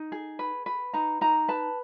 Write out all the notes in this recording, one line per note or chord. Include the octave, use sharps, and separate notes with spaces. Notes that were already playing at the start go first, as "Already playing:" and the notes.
Already playing: D#4
G#4
B4
B4
D#4 A#5
D#4 A#5
B4 A5